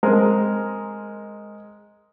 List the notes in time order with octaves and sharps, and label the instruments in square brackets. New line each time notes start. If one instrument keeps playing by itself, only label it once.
[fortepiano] G#3 C4 A#4